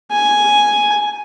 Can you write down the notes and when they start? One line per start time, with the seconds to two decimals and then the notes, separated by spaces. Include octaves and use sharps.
0.12 G#5